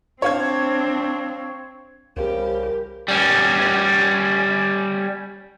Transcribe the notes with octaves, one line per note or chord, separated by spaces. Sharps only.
C4 D4 C#5 F5 G#6
C2 C#3 F3 G3 G4 A#4
G3 C#4